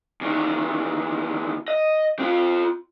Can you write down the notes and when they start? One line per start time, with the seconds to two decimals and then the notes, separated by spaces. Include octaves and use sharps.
0.21 E2 D#3
1.68 D#5
2.19 C4 F4